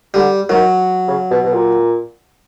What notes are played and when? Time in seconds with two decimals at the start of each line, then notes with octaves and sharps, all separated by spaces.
0.14 D3 G3
0.49 D#3 F#3
1.08 C#3
1.31 B2
1.44 B2
1.53 A#2